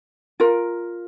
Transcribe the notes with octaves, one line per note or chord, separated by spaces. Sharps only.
F4 A#4